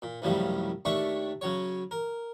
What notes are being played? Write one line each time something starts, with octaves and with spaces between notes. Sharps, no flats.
A#2
C2 F#2 A2 C#3 F3 G3
D#2 A3 D4 E5 C#6
C#3 F#3 C#5
A#4